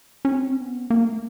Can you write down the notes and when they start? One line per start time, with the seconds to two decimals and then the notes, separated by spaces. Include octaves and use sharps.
0.25 C#4
0.32 C4
0.61 B3
0.90 A#3
1.05 A3